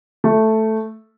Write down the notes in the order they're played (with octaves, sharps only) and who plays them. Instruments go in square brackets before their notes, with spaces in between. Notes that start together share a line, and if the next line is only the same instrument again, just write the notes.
[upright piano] A3